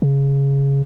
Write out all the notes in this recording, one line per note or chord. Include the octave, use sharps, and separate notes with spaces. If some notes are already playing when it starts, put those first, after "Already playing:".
C#3